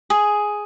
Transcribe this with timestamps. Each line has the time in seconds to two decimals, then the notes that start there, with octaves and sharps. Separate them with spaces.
0.10 G#4